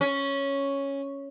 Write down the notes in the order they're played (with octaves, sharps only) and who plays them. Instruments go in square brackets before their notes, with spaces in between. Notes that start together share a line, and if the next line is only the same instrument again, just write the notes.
[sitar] C#4